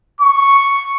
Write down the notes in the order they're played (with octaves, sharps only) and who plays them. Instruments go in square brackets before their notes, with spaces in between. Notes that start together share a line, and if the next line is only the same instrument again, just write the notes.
[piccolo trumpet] C#6